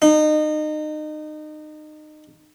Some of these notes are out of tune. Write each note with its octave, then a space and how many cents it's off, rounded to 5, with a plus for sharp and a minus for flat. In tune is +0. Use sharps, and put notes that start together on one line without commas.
D#4 -25